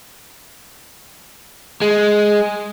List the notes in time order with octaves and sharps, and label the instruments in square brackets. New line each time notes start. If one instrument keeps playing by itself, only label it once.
[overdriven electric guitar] G#3